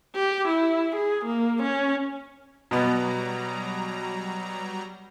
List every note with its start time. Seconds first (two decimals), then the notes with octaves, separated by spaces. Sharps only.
0.15 G4
0.48 E4
0.95 G#4
1.25 A#3
1.63 C#4
2.71 B2 F#3 G3 B3 A#5